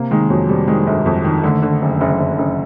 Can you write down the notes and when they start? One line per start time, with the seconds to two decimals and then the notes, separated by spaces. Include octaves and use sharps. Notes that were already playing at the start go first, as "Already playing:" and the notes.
Already playing: C3 A#3
0.11 D#3 G#3
0.30 F2 F#3
0.49 C3 G3
0.68 D#3 G#3
0.87 G1
1.06 F2
1.25 D#3
1.43 D3 A3
1.62 D3
1.82 F#1
2.01 F#1
2.19 F#1
2.38 F#1